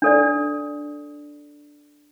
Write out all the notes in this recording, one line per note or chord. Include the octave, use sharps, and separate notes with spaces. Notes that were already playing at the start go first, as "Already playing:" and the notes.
D4 A4 D5